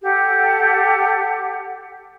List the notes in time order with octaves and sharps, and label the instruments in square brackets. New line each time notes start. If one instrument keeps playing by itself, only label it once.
[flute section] G4 A4 F#5